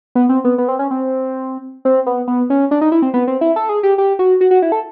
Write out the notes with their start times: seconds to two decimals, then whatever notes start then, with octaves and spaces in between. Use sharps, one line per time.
0.15 B3
0.29 C4
0.44 B3
0.58 B3
0.68 C4
0.79 C#4
0.91 C4
1.85 C4
2.06 B3
2.28 B3
2.50 C#4
2.71 D4
2.81 D#4
2.92 E4
3.02 C4
3.14 B3
3.28 C4
3.41 E4
3.56 A4
3.69 G#4
3.83 G4
3.98 G4
4.19 F#4
4.41 F#4
4.51 F#4
4.62 E4
4.72 A4